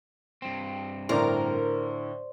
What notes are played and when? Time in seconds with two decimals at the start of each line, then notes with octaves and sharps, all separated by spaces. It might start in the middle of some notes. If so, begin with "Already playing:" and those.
0.42 G2 C4
1.09 A2 D3 A#4 C5 D5